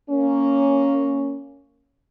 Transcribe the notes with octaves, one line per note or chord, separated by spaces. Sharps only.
A#3 C#4